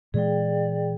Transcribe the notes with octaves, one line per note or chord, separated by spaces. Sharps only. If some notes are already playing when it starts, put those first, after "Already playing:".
A#2 E3 G#3 G#4 D5 G5